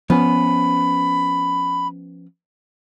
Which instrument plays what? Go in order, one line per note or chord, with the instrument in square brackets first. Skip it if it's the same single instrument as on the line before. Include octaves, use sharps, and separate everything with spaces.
[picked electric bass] F3 C#4 [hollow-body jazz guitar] B3 [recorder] B5